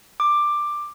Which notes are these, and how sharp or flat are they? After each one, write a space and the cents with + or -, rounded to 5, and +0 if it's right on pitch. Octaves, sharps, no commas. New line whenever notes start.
D6 +10